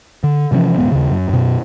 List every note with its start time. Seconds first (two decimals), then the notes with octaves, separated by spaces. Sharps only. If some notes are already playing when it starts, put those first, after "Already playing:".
0.24 D3
0.52 C3 E3 F3 C#4
0.78 D#1 G#2 B3
0.92 D#2 C#3
1.11 F#2
1.29 F#2 B2